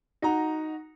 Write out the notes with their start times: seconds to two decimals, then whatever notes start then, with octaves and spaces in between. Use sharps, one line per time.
0.22 D#4 F#4 A#5